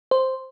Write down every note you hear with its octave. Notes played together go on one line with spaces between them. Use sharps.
C5